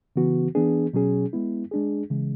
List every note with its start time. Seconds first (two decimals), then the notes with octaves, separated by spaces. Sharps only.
0.16 C#3 E3 B3 F#4
0.55 E3 B3 D4 G#4
0.93 B2 F#3 C#4 G#4
1.33 G#3 B3 E4
1.71 G#3 D4 G#4
2.10 C#3 E3 G#3